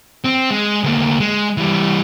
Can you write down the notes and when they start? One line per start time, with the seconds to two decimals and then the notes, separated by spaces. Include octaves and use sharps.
0.24 C4
0.51 G#3
0.84 D2 A#3
1.20 G#3
1.57 E3 G3